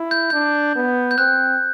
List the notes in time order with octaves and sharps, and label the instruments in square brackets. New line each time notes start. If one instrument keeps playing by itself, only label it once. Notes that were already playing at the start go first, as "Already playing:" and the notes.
Already playing: [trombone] E4
[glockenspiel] G6
[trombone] D4 [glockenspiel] G6
[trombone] B3
[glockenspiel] G6
[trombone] C4 [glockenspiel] F#6